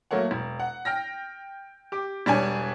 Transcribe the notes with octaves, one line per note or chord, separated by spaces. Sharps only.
F#3 A3 A#3 C#5 F#5
E1
F#5
G5 F6 A#6
G4 D6
E1 G3 D4 C#5 G#5